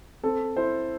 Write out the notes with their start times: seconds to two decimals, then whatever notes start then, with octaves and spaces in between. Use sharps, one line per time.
0.24 C4 A4
0.56 E4 C5